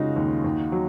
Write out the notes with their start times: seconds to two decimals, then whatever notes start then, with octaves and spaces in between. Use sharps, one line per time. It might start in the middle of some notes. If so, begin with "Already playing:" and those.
Already playing: C#3 G#3 D#4 F4 F#4
0.16 D#2
0.44 D#2
0.72 F#3